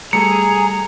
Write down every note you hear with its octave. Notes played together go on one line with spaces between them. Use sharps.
G3 A3 G#4 A4 A#5 C#7